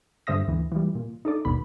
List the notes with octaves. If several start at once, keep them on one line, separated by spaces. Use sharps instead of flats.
G2 D3 C5 E5 D#6 A#6
D2 E3
E3 G3
A#2
D#4 A4 D5
G#1 D#2 B2 B5